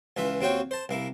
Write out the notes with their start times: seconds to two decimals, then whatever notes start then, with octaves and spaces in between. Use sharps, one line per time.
0.17 C#2 E3 F4 E5
0.41 D#2 C4 F4 F#4 C#5 G5
0.71 C5 A5
0.89 C2 A#3 E4